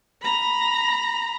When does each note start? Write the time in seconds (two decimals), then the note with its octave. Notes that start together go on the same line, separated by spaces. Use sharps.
0.22 A#5 B5